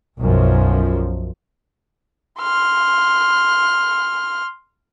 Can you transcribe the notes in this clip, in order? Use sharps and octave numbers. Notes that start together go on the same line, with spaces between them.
B1 F#2 F3
C6 F6